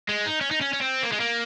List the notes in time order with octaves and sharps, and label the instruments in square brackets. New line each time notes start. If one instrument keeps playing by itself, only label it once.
[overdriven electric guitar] G#3
D#4
C#4
D#4
C#4
C#4
C4
A#3
G#3
A#3